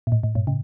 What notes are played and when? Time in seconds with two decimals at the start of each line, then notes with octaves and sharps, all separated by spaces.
0.07 A#2
0.12 A2
0.23 A2
0.35 G2 A#2
0.47 A2 C#3